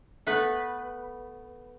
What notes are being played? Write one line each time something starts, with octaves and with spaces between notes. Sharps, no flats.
A3 B3 B4